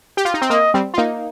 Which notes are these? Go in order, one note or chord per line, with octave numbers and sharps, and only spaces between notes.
G4
F4
D#4
C4
A#3 D#5
G3 C4
F4
A#3 D#4